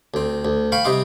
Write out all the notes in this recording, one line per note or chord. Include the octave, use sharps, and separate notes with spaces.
D2 C4
D2
F5 G5 B5 C#6
C3 G3 D#4 C6 D6